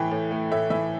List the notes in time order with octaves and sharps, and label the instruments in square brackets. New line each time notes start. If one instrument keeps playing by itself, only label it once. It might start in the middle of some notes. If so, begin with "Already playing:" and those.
Already playing: [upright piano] A2 E3 G5
A2
A3
A2 E5
E3 E5